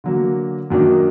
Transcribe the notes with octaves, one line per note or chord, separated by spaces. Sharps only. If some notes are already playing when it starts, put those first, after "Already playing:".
D3 F#3 A#3
F#2 D#3 F#3 A#3 D4